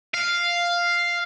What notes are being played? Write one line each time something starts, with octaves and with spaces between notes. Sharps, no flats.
F5